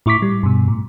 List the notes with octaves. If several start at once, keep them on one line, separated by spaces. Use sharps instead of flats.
A2 E4 C#6 D6 B6
G3
G2 B2
A2